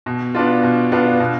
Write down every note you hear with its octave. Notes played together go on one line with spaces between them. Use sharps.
B2
B3 D4 F4
B2
B3 D4 F4
B2